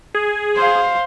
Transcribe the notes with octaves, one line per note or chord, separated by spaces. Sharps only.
G#4
C5 F5